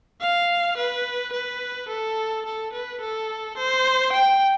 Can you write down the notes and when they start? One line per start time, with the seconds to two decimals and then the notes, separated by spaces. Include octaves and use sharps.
0.21 F5
0.77 B4
1.33 B4
1.89 A4
2.45 A4
2.73 B4
3.01 A4
3.57 C5
4.13 G5